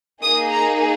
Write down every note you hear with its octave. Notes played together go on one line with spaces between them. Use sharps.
A#3 D#4 G#4 D#6
A#5